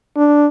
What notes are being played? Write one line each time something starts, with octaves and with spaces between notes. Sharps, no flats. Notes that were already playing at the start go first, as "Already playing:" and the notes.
D4